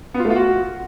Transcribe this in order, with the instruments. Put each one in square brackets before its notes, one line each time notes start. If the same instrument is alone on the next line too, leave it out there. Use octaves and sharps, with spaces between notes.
[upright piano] B3
F4
A3
F4
F#4